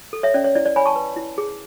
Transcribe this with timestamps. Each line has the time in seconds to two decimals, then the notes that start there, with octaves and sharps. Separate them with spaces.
0.13 A4
0.23 C#5 E5
0.34 C#4 D5
0.44 C#5
0.55 E4 D5
0.66 D5
0.76 C#5 G#5 B5
0.86 A5 C#6
0.96 B4
1.16 E4
1.38 G#4